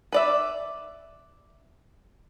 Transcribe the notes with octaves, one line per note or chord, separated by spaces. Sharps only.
B4 D5 E5